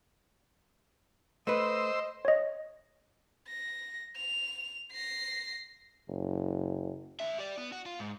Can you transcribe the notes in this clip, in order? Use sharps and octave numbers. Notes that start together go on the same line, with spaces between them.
A3 B4 C5 D#5 E6
C#5 D#5
A#6
F7
A#6 C7
F#1
D4 E5
G4 D5
B3
F#4
F4
G#2